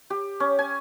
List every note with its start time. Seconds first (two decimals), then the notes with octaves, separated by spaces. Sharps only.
0.10 G4
0.40 C#4
0.59 G#5